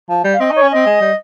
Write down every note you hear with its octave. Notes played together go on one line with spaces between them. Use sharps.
F3
G3
F5
C4 D#5
D#4
C#5
C#4
C4 D#5
G#3
G3